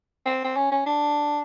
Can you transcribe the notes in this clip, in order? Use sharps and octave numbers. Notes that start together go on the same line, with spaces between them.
C4
C4
C#4
C#4
D4